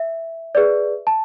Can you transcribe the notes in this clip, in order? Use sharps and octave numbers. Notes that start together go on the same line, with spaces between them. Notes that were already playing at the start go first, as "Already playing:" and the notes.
Already playing: E5
G#4 B4 D5
A5